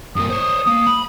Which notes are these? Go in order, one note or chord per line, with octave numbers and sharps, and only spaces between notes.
G2 A#3 D#6
C5 C#5
A#3 D#6
B5